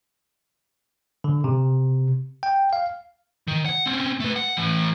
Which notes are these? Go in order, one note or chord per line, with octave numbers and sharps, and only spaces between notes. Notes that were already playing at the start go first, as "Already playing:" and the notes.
D3
C3
G5
F5
D#3
F#5
C4 C#4
A3 B4
F#5
A2 E3